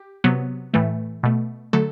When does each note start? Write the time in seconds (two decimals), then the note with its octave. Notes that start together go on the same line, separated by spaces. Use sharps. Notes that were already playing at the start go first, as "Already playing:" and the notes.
Already playing: G4
0.24 C3 F#3 B3
0.74 A2 E3 A3
1.23 B2 A3
1.73 D3 F#3 A3 A4